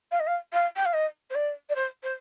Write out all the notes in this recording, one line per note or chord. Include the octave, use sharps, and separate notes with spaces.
F5
D#5
F5
F5
G5
F5
D#5
C5
D5
D5
C5
C5